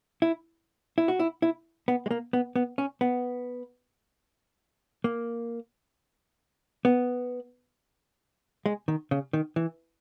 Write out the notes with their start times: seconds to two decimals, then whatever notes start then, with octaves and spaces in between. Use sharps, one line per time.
0.22 E4
0.98 E4
1.08 F#4
1.19 E4
1.42 E4
1.88 B3
2.06 G#3
2.11 A#3
2.33 B3
2.56 B3
2.78 C#4
3.01 B3
5.04 A#3
6.85 B3
8.66 G#3
8.88 D#3
9.11 C#3
9.33 D#3
9.56 E3